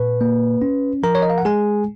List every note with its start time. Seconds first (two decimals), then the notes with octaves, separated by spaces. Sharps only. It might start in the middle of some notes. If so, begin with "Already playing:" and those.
Already playing: A#2 B4
0.21 A#3
0.62 C#4
1.03 F3 A#4 A#5
1.15 C#5
1.22 D#5
1.30 F5
1.38 F#5
1.45 G#3 G#4 G#5